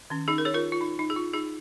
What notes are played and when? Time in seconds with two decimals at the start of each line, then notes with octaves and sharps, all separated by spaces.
0.10 D#3 C#4
0.28 D#4 G#4
0.38 A#4
0.45 G#4 C#5
0.54 F4 A#4
0.72 F4
0.81 D#4
0.99 D#4
1.10 G#4
1.16 F4
1.34 D#4 G#4